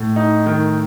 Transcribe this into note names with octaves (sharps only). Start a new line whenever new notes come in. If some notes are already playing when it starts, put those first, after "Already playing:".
Already playing: A2
D#4
D#3